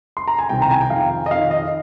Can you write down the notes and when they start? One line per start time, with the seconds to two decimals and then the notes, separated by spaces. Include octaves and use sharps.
0.17 C6
0.28 A#5
0.39 G#5
0.49 C2 C3 D#3 G5
0.62 A#5
0.71 G#5
0.81 G5
0.90 F2 D#3 F5
1.26 D#5
1.31 F2 D#3 F5
1.51 D#5